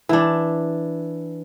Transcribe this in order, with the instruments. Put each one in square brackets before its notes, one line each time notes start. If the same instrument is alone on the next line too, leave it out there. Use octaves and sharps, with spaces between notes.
[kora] E3 D4